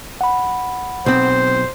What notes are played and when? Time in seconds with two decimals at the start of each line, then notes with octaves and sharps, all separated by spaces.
0.21 F#5 B5
1.06 B1 C4 C5